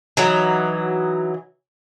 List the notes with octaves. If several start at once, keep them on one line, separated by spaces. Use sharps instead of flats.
E3 F#3 D#4